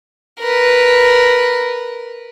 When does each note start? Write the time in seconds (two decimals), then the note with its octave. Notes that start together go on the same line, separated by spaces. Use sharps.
0.40 A#4 B4